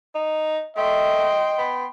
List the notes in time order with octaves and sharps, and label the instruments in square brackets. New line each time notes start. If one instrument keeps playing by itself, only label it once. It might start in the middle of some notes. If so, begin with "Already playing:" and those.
[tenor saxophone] D#4
[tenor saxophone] A3 [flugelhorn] D#5 [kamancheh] G5 C6
[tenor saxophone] B3